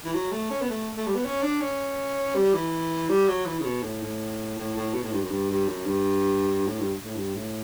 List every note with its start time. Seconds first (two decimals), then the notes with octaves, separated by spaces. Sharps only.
0.04 E3
0.14 F#3
0.32 A3
0.50 C#4
0.61 B3
0.70 A3
0.97 A3
1.07 G3
1.15 B3
1.25 C#4
1.42 D4
1.61 C#4
2.35 G3
2.54 E3
3.09 G3
3.28 F#3
3.46 E3
3.60 C#3
3.65 B2
3.83 A2
4.02 A2
4.58 A2
4.76 A2
4.94 B2
5.03 A2
5.12 G2
5.22 F#2
5.31 G2
5.50 G2
5.68 F#2
5.87 G2
6.67 A2
6.80 G2
7.04 A2
7.16 G2
7.35 A2